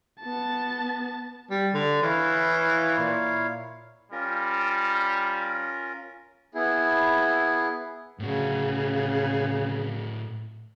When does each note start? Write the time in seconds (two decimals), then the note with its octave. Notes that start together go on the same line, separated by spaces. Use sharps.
0.21 B3 A5
1.50 G3
1.74 D3
2.03 E3 E4 C#5 F5
2.98 A#2
4.12 G3 C#4 F4 A#4
6.55 B3 E4 G#4
8.20 A2 C#3 F#4